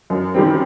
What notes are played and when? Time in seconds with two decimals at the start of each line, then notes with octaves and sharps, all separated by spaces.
0.10 F#2
0.34 D#3 G3 C4